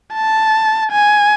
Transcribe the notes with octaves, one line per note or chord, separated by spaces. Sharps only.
A5
G#5